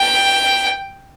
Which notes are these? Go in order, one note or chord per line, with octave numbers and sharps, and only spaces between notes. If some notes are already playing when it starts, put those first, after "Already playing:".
Already playing: G5